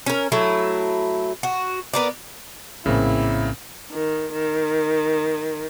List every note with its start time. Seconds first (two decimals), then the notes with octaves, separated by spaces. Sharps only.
0.06 C#4 A#4
0.32 F#3 A3 E4
1.43 F#4
1.93 B3 A#4 D5
2.86 A#1 A2 C#3 A#3 C4 E4
3.93 D#3
4.33 D#3